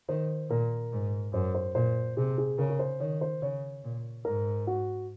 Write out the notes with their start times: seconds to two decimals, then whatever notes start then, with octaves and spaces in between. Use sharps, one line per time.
0.09 D#3 C5
0.50 A#2 A#4
0.92 G#2
1.34 F#2 C5
1.55 C5
1.75 A#2 C5
2.17 C3 G#4
2.38 G#4
2.58 C#3 A#4
2.70 A#4
2.79 C5
3.00 D#3 C#5
3.21 C5
3.42 C#3 C#5
3.84 A#2
4.25 G#2 A#4
4.67 F#4